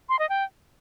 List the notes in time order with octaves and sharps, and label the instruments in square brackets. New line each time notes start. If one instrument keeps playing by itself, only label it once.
[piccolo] C6
D#5
G5